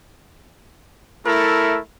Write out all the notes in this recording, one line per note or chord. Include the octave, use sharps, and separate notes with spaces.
A3 E4 A4 A#4